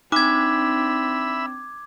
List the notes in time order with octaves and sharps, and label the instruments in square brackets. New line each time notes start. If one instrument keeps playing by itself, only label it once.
[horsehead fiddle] C4 D4 [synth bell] D#4 [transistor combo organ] E5 B5 E6 [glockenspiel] D6 G#6